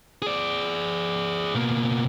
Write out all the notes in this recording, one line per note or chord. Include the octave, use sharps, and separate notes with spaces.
G#4 D5
B2 A#3